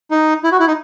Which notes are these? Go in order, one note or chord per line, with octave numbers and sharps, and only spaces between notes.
D#4
E4
F#4
E4
D#4